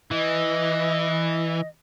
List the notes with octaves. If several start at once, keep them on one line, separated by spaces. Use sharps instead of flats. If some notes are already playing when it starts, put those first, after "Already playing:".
E3 D#5